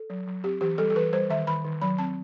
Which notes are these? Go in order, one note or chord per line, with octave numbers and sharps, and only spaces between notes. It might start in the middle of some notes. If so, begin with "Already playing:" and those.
Already playing: A4
F#3
F#3
C4 G4
E3 G4
G3 A4
A4
E3 B4
G3 C5
D#3 E5
D#3 B5
D#3
F#3 B5
C4 A5